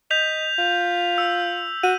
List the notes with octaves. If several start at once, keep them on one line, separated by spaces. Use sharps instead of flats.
D#5 G6 B6 F7
F4
E6
F#4 D#7